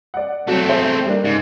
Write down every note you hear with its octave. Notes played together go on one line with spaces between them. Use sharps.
D5 F#5
F#3 A3 C4 F#4
G#4 C5 E5
G3 A#3 D4
G#2 C#3